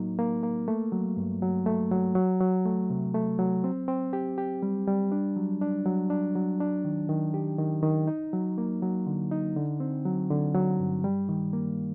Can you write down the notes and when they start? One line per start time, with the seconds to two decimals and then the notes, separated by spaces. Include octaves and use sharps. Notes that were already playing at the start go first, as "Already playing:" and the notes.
Already playing: A2 F#3 A#3 D#4
0.19 A#3
0.43 A#3
0.68 A3
0.92 F#3
1.17 G2
1.42 F#3
1.66 A3
1.91 F#3
2.15 F#3
2.41 F#3
2.65 A3
2.90 C3
3.14 A3
3.39 F#3
3.64 C4
3.88 C4
4.13 G4
4.38 G4
4.63 G3
4.87 G3
5.12 D4
5.36 F#3
5.62 D4
5.86 F#3
6.10 D4
6.35 F#3
6.60 D4
6.85 D#3
7.09 D#3
7.34 G4
7.59 D#3
7.83 D#3
8.07 D#4
8.33 F#3
8.58 A#3
8.82 F#3
9.07 D3
9.31 D#4
9.56 D3
9.80 C4
10.05 F#3
10.30 D3
10.55 F#3
10.80 G2
11.04 G3
11.29 D#3
11.53 A#3